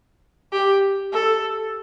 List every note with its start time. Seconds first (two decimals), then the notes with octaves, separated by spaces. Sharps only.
0.52 G4
1.13 A4